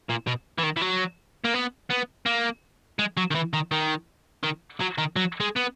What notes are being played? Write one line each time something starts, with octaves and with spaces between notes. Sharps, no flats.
A#2
B2
E3
D#3
E3
F#3
A#3
B3
B3
A#3
G#3
F#3
D#3
E3
D#3
D#3
D#3
F#3
D#3
F#3
G#3
B3